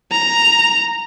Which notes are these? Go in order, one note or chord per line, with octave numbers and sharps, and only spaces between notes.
A#5